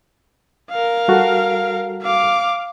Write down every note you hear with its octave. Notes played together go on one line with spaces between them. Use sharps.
A#4 F5
G3 F#4 A4
F5 D6